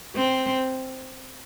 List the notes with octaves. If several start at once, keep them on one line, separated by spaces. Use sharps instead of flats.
C4